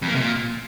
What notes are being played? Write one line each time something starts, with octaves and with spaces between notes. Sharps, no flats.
F2
A#3
C3
A#2